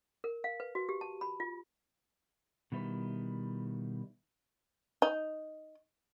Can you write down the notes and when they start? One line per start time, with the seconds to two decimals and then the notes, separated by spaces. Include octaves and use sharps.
0.24 A#4
0.44 F5
0.60 B4
0.75 F#4
0.89 G4
1.01 A5
1.21 B5
1.40 F4
2.72 B2 D#3 G3 E4 B4
5.02 D#4